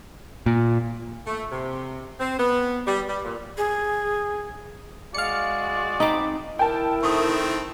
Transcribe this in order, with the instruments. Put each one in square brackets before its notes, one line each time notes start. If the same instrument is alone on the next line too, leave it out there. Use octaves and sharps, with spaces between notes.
[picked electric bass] A#2
[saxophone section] A3
C3
C4
B3
G3
G3
A#2
[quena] G#4
[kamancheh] G#3 F#4 [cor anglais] D5 [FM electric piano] F5 C#7
[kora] C4 D#4 [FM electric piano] D#5 B5 D6
[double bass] E4 [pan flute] A#4 [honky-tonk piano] G5 A5
[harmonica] D#3 A3 C4 [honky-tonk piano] C#6 D#6